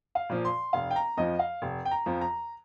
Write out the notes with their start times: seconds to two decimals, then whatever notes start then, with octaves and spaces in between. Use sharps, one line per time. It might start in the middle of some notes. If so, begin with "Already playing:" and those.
0.15 F5
0.29 A#2 F3
0.45 C6
0.73 F1 F5
0.91 G5
0.96 A#5
1.17 F2 F3 D#5
1.39 F5
1.62 F1
1.85 G5
1.91 A#5
2.06 F2 F3
2.21 A#5